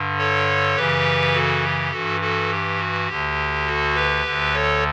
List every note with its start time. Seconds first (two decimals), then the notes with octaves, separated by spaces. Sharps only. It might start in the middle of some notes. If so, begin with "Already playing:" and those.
Already playing: G2 D3
0.18 A4 C#5
0.75 F#2 C#3 E3 G4 B4
1.34 F#4 A4
1.63 G4
1.91 G2 E3 F#4 A4
2.21 F#4 A4
2.50 G4
2.79 F#4
3.08 D2 D3 G4
3.66 F#4 A4
3.94 G4 B4
4.25 D2 D3
4.53 A4 C#5